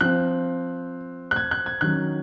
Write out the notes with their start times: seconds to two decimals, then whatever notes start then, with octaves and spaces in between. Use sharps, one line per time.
0.01 F3 C4 F#6
1.31 F#6
1.36 G#6
1.51 F#6
1.66 G#6
1.81 D#3 F#3 C#4 F#6